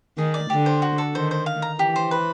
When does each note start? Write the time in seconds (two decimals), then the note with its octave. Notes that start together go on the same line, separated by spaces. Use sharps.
0.18 D#3 G#4
0.34 D5
0.50 D3 G4
0.66 C5
0.82 F#4
0.98 A4
1.15 D#3 C5
1.31 C5
1.46 F5
1.62 A#5
1.79 E3 G4
1.96 C5
2.11 B4